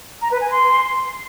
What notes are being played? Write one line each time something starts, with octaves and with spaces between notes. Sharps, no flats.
A#5
B4
G#5
C6